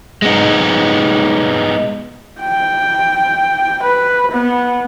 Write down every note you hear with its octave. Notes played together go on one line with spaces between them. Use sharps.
G#3 B3 D#4
G5
B4
B3